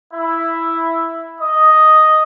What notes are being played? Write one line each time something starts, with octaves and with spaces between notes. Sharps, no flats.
E4
D#5